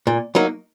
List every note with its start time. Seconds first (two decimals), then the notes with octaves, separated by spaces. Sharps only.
0.07 A#2
0.35 F#3 A#3 D#4